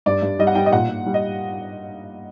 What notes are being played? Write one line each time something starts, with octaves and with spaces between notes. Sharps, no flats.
G2 D5
G2
G3 D#5
F#5
G3 G5
D#5
A#2 F#5
A#2
G3
D#5